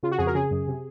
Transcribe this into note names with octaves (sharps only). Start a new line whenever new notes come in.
C#3 F4
F#4
F2 G#4
A#4
C#3 G#4
F#2
C3